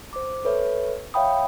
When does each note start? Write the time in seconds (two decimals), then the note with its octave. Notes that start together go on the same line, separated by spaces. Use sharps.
0.13 C5 D6
0.45 A4 B4 C#5 E5
1.14 C#5 E5 F5 G5 B5 D#6